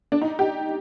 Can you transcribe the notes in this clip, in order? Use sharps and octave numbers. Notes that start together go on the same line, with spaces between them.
D4
D#4
G4